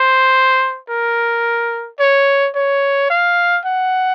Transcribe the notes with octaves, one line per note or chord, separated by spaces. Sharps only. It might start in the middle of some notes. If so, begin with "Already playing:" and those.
Already playing: C5
A#4
C#5
C#5
F5
F#5